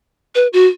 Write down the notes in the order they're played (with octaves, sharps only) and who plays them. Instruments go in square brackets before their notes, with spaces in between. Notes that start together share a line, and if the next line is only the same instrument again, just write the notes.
[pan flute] B4
F#4